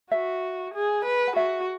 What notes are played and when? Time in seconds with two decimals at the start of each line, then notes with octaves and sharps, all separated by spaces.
0.11 F#4 E5
0.74 G#4
1.05 B4
1.27 F#5
1.36 F#4 E5